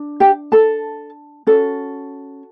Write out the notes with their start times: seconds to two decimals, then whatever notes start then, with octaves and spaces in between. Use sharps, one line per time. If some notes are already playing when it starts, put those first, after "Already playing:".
Already playing: D4
0.20 G4 G5
0.52 A4 A5
1.47 C#4 F#4 A4